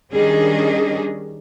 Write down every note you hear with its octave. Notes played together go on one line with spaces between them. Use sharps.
D#3 G3 C#4 D4 G#4 D#5